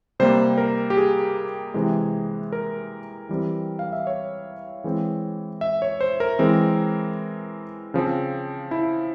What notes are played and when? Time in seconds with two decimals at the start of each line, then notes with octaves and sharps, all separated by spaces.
0.20 C3 G3 A#3 C5
0.58 A#4
0.90 G4
0.97 G#4
1.74 C3 E3 G#3
2.52 A#4
3.29 E3 G3 C4
3.79 F5
3.92 E5
4.07 C#5
4.84 E3 G#3 C4
5.61 E5
5.82 C#5
6.01 C5
6.20 A#4
6.39 E3 G#3 C4
7.94 C#3 F3 C4
8.71 E4